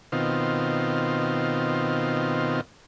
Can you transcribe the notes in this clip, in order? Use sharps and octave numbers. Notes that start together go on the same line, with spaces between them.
B2 D#3 C4 F4